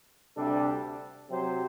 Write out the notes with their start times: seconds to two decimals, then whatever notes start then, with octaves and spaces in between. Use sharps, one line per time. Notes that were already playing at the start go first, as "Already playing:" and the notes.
0.36 D2 C3 G3 D4 A4
1.29 C3 F#3 C4 G4 C5